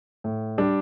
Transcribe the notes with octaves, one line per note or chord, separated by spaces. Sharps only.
A2
G3 D4